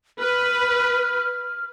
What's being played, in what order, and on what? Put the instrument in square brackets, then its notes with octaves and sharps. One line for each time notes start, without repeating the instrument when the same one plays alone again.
[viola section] B4 [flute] F6